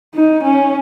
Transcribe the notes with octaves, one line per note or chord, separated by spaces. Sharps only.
D#4
C#4